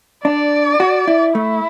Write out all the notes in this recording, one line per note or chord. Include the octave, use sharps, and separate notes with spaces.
D4 D5
F#4
E4
A3 E4